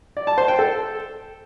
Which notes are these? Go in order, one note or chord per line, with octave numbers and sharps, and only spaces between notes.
D5
A5
C5
G5
A4